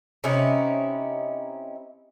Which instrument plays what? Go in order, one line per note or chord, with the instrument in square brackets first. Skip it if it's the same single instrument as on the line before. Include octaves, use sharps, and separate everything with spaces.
[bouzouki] C3 C#4 D#4 E4